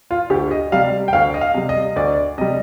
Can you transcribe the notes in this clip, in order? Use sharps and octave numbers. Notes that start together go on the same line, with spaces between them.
F4
D2 G4
D#5
C3 G3 F5
G5
D2 F5
D#5
F5
C3 G3
D#5
D2 D5
C3 G3 D#5